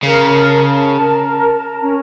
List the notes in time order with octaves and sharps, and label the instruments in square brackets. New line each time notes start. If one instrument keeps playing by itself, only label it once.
[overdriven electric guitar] C#3 [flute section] A#4
[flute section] A5
A5
A#4
A5
A#4
C#4